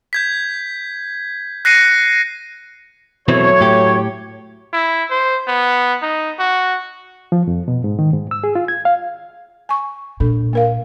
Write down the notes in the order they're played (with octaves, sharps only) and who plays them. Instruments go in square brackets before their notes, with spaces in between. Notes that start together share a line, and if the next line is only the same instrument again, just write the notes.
[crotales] G6 G#6 B6
F#6 A#6 C7 C#7 D#7
[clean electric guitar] B2 E3 C4 [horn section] F#3 A3 C#5
[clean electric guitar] A2 G4
[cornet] E4
C5
B3
D#4
F#4
[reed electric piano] F3
F2
B2
G#2
D#3
G#2
E6
G#4
F4
G#6
F5
[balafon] G#5 C#6
[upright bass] A#2 [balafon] D4 A4
[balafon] A#3 A#4 F5